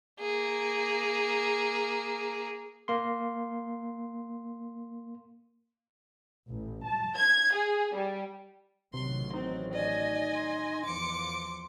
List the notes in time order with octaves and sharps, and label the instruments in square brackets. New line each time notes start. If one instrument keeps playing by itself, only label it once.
[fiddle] A#3 G#4
[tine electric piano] A#3 C6
[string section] A1
A5
G#6
G#4
G3
[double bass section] A1 D#3 F#3 [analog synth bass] C3 [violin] C6
[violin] C4 [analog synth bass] D#4
[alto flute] D5 [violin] D#5 G#5
[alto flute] C6
[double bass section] E2 F3 [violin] D6 C#7